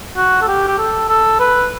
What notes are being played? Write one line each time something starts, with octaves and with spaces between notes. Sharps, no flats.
F#4
A4
G4
G4
A4
A4
B4